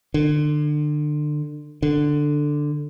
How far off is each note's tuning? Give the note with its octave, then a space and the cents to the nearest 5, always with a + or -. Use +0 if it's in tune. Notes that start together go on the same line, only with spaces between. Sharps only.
D3 +30
D3 +5